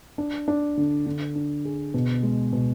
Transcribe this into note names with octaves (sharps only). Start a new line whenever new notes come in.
D4
D4
D3
D3
D4
G#4
B2
G#3
B2